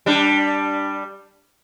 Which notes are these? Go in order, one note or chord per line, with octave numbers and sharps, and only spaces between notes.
G3 D4